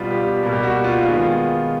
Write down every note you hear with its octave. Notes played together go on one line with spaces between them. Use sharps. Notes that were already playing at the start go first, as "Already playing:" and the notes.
Already playing: B2 G3 B3 F4
G4
B2 G3 A#3
G4
F#4
F4
D#3 G#3 B3 F4